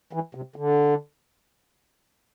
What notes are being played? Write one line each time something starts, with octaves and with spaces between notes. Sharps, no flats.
E3
C3
D3